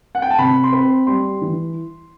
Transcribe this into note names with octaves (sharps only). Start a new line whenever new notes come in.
F#5
G5
A5
C3 B5
C6
C4 B5
G3 C6
E3